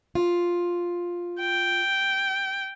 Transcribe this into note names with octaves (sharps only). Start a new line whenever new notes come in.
F4
G5